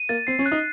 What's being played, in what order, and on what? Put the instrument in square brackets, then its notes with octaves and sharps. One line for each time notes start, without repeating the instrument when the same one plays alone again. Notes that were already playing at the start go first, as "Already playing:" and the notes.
Already playing: [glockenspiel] D#7
[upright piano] A#3 [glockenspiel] A6
[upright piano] C4 [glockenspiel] C7
[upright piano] C#4
[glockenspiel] F#6
[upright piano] D#4